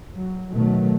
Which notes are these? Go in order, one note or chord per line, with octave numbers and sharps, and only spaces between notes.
F#3
B2 D#3 F#3 A3